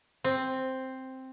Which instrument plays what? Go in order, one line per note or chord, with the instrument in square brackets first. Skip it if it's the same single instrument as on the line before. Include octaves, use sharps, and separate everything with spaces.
[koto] C4